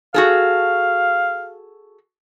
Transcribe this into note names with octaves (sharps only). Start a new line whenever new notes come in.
F#4 G#4 A4 F5